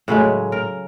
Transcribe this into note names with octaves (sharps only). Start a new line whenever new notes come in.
A2 C#3 F#3 G#3
A#4